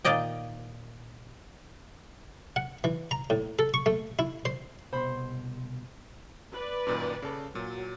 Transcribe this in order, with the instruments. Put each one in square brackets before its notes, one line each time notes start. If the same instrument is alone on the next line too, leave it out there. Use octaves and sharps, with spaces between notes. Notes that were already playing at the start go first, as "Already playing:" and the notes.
[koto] A#2 D#3 D5 D#5 G5
[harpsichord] F#5
E3
A#5
A2
A4
C#6
A3
E4
C5
[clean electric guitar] C2 B2 C6 [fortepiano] C5 B5
[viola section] B4 D5
[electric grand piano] F#2 A#2 D#3
C#3 A4
[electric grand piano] A#2 [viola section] F#3